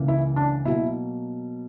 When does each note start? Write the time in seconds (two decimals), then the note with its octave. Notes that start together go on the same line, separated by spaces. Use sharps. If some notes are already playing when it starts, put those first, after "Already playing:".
Already playing: C#2 C#3 E3 A#3
0.08 E4
0.36 D4
0.65 B2 F#3 A#3 E4